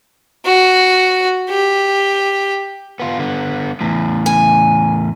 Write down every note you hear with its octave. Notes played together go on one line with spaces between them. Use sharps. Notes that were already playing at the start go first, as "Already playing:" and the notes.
F#4
G4
B3 F4
D3 B3
E2 A2
G#5